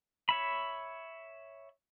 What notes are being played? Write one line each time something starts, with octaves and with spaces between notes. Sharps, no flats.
C#5 E5 B5